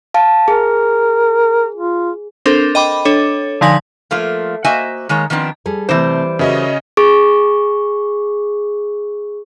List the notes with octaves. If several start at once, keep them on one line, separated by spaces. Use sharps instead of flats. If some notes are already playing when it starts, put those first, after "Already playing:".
F5 A5
G#4 A#4
F4
C4 D4 A4 A#4 C5
D#5 G5 B5 D6
D4 A4 C#5
D3 F3 D#4 G#5 B6 F#7
F3 A3 A#3 F4
A#3 F#4 C5 D#5 E5 G#5
D#3 G#3 A#3 C#5
D#3 F3 B3 C4 D4
G3 G#4 A4
C3 E3 G3 A3 C5
C#3 C#4 F#4 A#4 D#5 E5
G#4 C#6